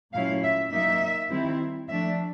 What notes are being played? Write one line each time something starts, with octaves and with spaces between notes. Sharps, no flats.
A#2 F#3 A3 C#4 E4 F5
E5
F#3 A#3 D#4 E5
D#3 G3 C4 E4
F3 A3 D4 E5